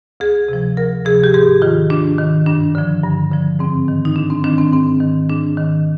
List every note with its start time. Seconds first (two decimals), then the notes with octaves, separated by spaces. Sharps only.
0.20 D2 G#4
0.48 C3 F3
0.77 D2 A#4
1.05 C3 F3 G#4
1.24 G4
1.34 G#2 G#4
1.62 D#3 F4
1.90 G#2 D4
2.18 D#3
2.46 G2 D4
2.75 D3 F3
3.03 G2
3.31 D3 F3
3.59 G#2 C4
3.88 D#3
4.05 D#4
4.16 G#2 D4
4.30 C4
4.44 D#3 D4
4.58 C4
4.73 G#2 C4
5.01 D#3
5.30 G#2 D4
5.57 D#3